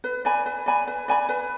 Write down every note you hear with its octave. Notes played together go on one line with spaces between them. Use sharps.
B4
D5 G#5 B5
B4
D5 G#5 B5
B4
D5 G#5 B5
B4